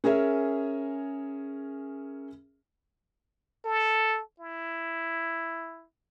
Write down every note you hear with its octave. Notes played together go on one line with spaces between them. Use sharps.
C#4 G#4 A#4 E5
A4
E4